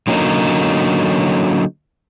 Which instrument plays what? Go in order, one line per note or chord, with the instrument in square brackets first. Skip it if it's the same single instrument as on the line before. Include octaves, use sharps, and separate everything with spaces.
[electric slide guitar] D3 F#3 A#3 C#4 D#4